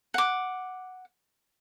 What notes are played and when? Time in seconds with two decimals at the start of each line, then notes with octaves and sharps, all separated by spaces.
0.14 F#5 D6